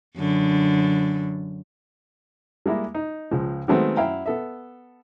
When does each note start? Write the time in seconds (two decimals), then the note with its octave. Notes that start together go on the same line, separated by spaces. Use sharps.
0.17 F#2 D3
2.66 G3 G#3 A#3 E4
2.95 D#4
3.31 C#2 F3 G#3
3.68 D#3 F#3 G#3 A3 B3 C4
3.97 F#2 E4 F5 G5 A#5
4.26 B3 A4 E5